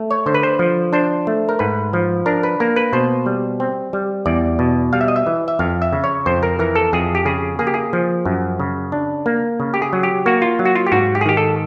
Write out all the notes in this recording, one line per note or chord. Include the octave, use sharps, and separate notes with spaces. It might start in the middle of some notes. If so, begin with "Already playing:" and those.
Already playing: A3
C#5
D3 C5
B4
C5
F3
D4 C5
A3
A#4
G#2 B4
F3
D4 A#4
B4
A#3 A#4
B4
B2 C5
G3
C4
G3
E2 D5
B2
G3 F5
E5
D#5
E5
E3
E5
F2 F5
E5
C#3
C#5
F2 C5
A#4
E3 A#4
A4
F2 G#4
G4
C#3 G#4
A#3 G#4
G4
G#4
F3
F#2
C#3
D4
A#3
C#3
G4
G#4
F#3
G4
A#3 F#4
F4
F#3
F#4
F4
G4
G#2 F#4
G4
G#4
D#3 G4
A4